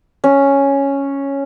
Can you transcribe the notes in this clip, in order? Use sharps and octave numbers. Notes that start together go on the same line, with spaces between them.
C#4